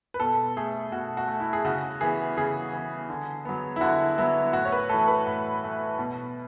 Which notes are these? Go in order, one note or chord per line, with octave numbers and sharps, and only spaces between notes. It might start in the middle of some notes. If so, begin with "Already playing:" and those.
B4
B2 A4
A3 G#4
B2 F#4
F#4
A3
E4
G#4
C#3 F#4
E3 B3 G#4
C#3 G#4
E3 B3
D3
F#3 B3
E4
D3 F#4
F#3 B3 E4
A2 F#4
C#5
B4
E3 A3 A4
B4
A2
E3 A3
B2